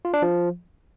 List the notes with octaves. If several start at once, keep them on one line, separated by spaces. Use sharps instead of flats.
F4
D4
F3